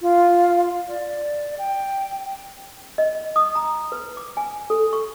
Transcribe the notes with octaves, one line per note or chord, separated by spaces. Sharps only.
F4
D5
G5
D#5
D#6
A#5
B4
D6
G#5
A4
C#6